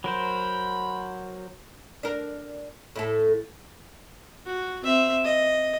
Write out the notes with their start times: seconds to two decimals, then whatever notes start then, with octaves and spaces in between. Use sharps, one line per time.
0.04 F#3 A#4 C5 B5
2.03 D4 A#4
2.96 A2 E4 A4
4.46 F#4
4.84 C4 E5
5.24 D#5